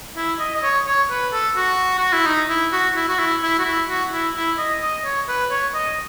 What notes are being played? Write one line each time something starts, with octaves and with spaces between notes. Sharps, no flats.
E4
D#5
D#5
C#5
C#5
B4
A4
F#4
F#4
E4
D#4
E4
F#4
E4
F#4
E4
E4
F#4
E4
F#4
E4
E4
D#5
D#5
C#5
B4
C#5
D#5